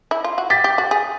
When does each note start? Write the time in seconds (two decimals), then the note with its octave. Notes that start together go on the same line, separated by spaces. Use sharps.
0.11 E4
0.24 F4
0.38 F#4
0.50 G4 A6 B6
0.64 G4
0.78 F#4
0.91 G#4